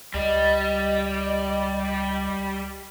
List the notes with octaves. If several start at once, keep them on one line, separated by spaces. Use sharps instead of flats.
C#2 G3 D#5